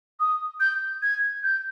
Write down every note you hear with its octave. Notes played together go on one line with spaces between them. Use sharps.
D#6
G6
G#6
G6